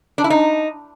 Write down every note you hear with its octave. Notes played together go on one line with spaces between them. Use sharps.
D4
E4
D#4